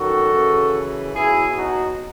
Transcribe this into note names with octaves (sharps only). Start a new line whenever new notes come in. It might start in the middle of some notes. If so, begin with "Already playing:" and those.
Already playing: F#2 D#3 F#3 F#4 A4
F#2 C#3 E3
B2 F#3 E4 G#4
D#4 F#4